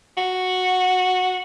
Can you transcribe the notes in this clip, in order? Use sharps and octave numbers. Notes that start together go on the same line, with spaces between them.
F#4